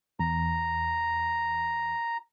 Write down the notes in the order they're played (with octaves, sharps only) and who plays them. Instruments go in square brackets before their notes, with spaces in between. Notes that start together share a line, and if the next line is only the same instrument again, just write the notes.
[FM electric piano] E2 [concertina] A#5